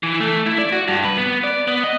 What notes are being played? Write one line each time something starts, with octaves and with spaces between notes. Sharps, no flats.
E3
A3
E4
D5
F#4
G2
B4
B3
D5
B3
D#5